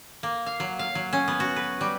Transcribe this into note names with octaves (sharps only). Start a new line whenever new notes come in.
A#3
F5
F#3
F5
F#3
C#4
B3
F#4
B4
G3